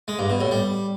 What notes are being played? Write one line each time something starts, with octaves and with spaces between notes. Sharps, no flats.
G#3
G2
B2
A2
G3